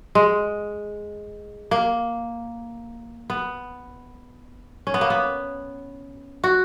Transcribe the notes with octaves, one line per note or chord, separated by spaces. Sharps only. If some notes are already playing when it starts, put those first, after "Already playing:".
G#3
A#3
B3
C#4
B3
A#3
B3
F#4